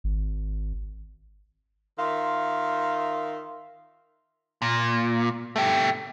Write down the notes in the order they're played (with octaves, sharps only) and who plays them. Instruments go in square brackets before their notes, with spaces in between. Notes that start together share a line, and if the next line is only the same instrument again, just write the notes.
[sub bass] G#1
[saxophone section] D#3 F4 E5 F5
[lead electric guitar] A#2
A3 G4